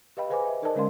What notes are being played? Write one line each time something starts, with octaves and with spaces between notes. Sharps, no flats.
G4 B4 D#5 F5 G5 B5
G#4 B4 C5 G#5 B5 D6
D#5 E5
D#4 A#4 C5 D5 D#5 A5
D3 G#3 C#4 A#4 F5 C6